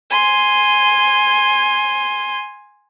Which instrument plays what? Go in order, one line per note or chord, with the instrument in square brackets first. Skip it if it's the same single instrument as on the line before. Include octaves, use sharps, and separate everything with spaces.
[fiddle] G#5 C6